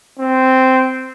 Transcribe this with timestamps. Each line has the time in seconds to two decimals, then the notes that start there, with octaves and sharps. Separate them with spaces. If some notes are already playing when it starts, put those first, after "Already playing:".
0.19 C4